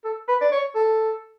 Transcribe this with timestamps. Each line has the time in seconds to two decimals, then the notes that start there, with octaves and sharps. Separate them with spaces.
0.04 A4
0.28 B4
0.41 D5
0.52 C#5
0.75 A4